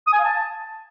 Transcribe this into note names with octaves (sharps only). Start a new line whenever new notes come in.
D#6
G#5
F5
A5